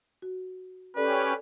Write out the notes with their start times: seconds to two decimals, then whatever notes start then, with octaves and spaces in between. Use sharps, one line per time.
0.22 F#4
0.97 C#4 G4 A4 B4 D5